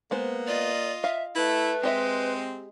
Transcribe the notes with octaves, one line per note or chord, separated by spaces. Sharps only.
G#3 A#3 B3 C5
F4 D5 D#5
E5 F5
A3 E4 B4
G#3 C4 G4 D#5 E5